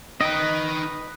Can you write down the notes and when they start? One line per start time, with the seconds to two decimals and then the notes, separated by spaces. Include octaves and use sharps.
0.21 D#4 B4 D#5 G5